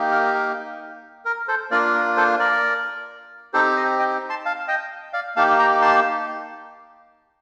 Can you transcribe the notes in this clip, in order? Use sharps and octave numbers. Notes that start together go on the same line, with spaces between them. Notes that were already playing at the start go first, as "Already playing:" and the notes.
Already playing: A#3 D#4 G4
A#4
A#4
A#4
A4 C5
A#3 D4 F4 A#4 D5
A#4
A4 C5
A#4 D5
C4 D#4 G4 A4 C5
C5 D#5
D#5 G5
A5 C6
F5 A5
D#5 G5
D5 F5
A#3 D#4 G4 F5 A5
G5 A#5
A5 C6